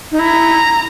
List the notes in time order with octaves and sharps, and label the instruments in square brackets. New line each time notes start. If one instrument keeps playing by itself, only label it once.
[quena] D#4
[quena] E4 [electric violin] A#5